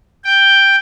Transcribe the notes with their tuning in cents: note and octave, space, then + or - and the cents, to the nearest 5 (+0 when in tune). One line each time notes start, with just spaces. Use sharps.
G5 +5